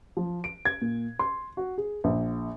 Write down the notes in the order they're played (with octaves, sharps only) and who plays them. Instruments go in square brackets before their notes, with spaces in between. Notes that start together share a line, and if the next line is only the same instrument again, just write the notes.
[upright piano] F3
D7
G#6
A#2
C6
F#4
G#4
A#1